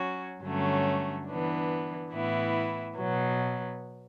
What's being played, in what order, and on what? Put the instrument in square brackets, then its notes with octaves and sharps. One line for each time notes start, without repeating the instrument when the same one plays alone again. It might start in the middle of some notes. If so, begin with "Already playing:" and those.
Already playing: [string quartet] F#3 C#4 F#4
G2 D3 F#3 A3 C#4
E3 B3 D4
A2 E3 B3 E4
B2 F#3 B3